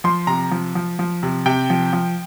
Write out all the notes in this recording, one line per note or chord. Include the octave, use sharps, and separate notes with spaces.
F3 C6
C3 A#5
F3
F3
F3
C3
C3 G5
F3
F3